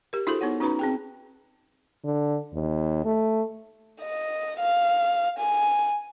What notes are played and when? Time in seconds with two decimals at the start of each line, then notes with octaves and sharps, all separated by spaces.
0.13 G4 A#4
0.27 D4 E4 F#4 G#4 A4 C5
0.41 B3 D#4 C#5 F#5
0.60 C#4 D#4 F#4 B4 A#5 B5
0.79 C4 G#4 G5
2.05 D3
2.54 D#2
3.05 A3
4.02 D#5
4.60 F5
5.39 G#5